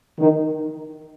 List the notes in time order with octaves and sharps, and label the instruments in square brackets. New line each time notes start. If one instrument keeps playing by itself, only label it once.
[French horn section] D#3